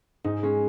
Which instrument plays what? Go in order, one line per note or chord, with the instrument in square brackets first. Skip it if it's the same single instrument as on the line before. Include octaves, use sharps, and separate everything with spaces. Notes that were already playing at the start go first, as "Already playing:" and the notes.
[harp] G#2 [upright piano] D#4
[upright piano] G#3 [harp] C#4